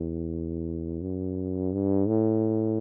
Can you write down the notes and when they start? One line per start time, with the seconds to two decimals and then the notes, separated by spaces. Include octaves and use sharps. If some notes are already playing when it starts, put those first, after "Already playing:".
Already playing: E2
1.02 F#2
1.73 G2
2.08 A2